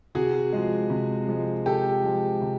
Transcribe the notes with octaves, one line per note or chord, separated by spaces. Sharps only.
C3 F#4 G#4
F3 G#3
C3
F3 G#3
C3 G4 A4
F3 G#3
C3